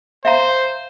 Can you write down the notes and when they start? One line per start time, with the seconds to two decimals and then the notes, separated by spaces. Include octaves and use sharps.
0.25 C5 E5 F5 A#5